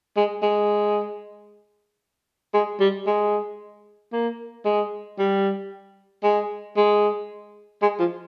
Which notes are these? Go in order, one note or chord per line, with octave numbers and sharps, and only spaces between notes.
G#3
G#3
G#3
G3
G#3
A#3
G#3
G3
G#3
G#3
G#3
F3